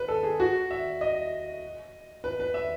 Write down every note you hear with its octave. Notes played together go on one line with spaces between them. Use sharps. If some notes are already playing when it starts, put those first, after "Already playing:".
Already playing: B4
A4
G#4
F#4
E5
D#5
B4
B4
E5